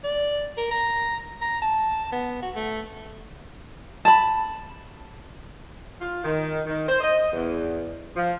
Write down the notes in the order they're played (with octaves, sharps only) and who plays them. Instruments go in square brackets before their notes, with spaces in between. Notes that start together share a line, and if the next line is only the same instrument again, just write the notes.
[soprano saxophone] D5
A#4
A#5
A#5
A5
B3
F#4
A3
[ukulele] A5 B5
[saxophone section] F4
D#3
D#3
C5
D#5
E2
F3